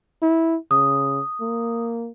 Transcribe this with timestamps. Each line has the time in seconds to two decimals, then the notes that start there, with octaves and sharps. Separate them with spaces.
0.22 E4
0.71 C#3 D#6
1.41 A#3